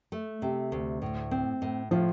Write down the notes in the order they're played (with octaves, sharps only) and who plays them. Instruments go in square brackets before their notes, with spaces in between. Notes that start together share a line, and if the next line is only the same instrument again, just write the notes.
[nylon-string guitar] A3
C3
D2
A2
C4
A2
[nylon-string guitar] A2 [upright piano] F3 F4